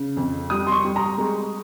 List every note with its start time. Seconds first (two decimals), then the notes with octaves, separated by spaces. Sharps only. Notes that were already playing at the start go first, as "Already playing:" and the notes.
Already playing: C#3
0.16 F2
0.50 G3 D#6
0.67 C6
0.72 C#6
0.84 G3
0.96 A#5
1.18 G#3